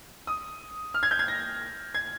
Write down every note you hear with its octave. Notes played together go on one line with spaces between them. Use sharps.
D#6
F6
G#6
G6
G#6
A#6
G#6